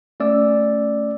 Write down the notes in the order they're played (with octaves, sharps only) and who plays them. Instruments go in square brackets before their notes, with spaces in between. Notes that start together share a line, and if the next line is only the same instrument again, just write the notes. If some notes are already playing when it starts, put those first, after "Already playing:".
[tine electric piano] A3 C#4 D5 E6